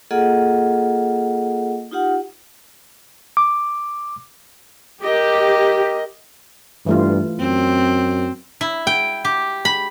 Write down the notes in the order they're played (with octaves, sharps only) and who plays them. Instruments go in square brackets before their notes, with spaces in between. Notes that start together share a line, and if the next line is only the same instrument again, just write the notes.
[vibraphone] A#3 F4 G#4 A4 D#5 F#5
D#4 F4 G4 F#5
[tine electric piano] D6
[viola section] G4 [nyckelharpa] A#4 D#5
[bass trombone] G2 [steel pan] E3 A3 F4
[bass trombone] F#2 [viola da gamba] C4
[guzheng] E4
G5
G4
B5